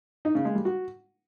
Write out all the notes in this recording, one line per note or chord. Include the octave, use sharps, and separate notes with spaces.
D#4
C#3
G#3
G3
F#4